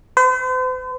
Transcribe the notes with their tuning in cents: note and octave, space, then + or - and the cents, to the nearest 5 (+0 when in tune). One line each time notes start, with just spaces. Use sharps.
C5 -45